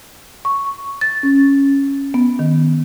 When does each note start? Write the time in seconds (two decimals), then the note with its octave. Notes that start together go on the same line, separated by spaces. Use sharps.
0.45 C#6
1.01 A6
1.23 C#4
2.14 B3
2.39 D#3